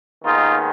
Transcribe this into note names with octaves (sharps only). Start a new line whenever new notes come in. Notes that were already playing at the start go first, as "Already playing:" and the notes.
D#2 D#3 G#3 B3 D#4 F4